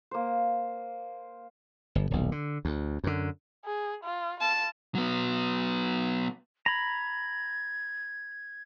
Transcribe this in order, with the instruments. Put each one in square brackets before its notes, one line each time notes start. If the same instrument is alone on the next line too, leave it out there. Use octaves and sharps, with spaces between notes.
[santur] A#3 C5
[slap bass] G1
D#1 B1
D3
D2
F#2 D3
[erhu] G#4
F4
[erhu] F4 [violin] A5
[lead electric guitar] F#3 B3
[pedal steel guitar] A#5 B5 [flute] G#6